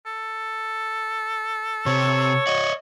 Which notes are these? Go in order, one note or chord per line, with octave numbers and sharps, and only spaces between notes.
A4
C3 C4 C#5
F#4 D5 D#5